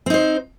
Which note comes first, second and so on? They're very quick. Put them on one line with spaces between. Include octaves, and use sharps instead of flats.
C4 D#4 C5